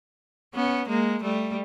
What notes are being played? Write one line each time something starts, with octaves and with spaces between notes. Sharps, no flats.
B3 C#4
G#3 A#3
G3 A3